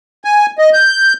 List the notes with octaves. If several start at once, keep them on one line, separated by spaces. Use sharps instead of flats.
G#5
D#5
G6